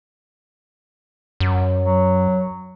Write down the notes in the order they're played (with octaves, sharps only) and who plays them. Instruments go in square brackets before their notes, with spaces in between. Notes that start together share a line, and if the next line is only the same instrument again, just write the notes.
[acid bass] F#2
[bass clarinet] F#3